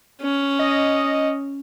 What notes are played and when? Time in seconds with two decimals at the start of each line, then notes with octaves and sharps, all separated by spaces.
0.21 C#4
0.59 D#5